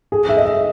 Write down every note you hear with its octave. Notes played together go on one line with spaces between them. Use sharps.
G#4
E5
D#5
E5